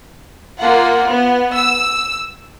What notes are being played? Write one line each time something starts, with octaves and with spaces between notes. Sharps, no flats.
A#3 F4 F#5
B3
E6